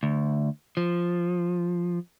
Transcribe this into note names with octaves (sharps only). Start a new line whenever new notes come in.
D2
F3